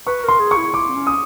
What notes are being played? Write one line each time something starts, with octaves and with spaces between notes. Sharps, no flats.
B4 C#6
A#4 C6
G#4
C#6
E4
E4 D6
C4
C#4
D#6